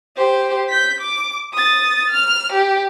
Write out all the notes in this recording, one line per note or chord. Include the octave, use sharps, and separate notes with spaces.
G4 C5
G6 B6
D6
D#6 A6
F6
G4